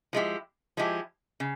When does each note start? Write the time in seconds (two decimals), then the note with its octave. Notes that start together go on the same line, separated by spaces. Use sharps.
0.13 F3 G#3 E4 G4
0.77 F3 G#3 E4 G4
1.40 C#3